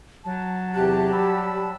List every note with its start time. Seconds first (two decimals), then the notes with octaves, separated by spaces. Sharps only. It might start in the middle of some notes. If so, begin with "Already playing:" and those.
0.24 F#3 A5
0.74 E2 C3 G4 F#6
1.13 G3 B5 E6